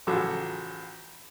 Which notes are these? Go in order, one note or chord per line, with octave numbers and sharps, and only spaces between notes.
A1 C#3 F3 F#4 A4 D6